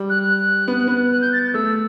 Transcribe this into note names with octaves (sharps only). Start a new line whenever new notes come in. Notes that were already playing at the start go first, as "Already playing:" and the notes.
Already playing: G3
F#6
F#6
B3
B3
F#6
G6
A6
A6
A3 E6